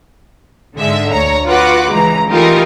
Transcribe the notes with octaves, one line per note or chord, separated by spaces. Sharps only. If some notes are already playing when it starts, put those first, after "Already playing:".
G#2 D3 G#3 E5
D2 C#5 A#5
F4 F#4 B4 F#5 D6
C#2 E3 A#5
E3 A3 D#4 F4 G4 A#4